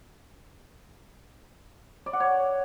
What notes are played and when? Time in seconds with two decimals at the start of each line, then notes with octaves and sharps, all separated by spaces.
2.06 D5
2.13 F#5
2.20 C#5